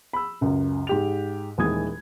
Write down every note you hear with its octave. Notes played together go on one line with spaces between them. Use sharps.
B5 E6
C#2 F#2
G#2 G4 F7
D#1 D#2 E3 G#3 D#6 G#6